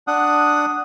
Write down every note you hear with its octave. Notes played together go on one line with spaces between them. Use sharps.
D4 F#5 D#6